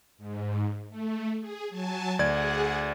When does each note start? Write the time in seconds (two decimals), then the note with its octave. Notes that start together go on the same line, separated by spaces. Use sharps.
0.18 G#2
0.89 A3
1.40 G#4
1.70 F#3 G#5 A5
2.19 D2 G#4 D5 F#5 G#6